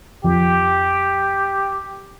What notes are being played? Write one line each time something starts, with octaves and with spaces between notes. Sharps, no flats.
F2 F3 G4